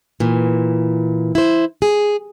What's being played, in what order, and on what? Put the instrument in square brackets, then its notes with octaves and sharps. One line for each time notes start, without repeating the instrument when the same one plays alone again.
[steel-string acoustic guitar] A#2 E3
E4 C5
G#4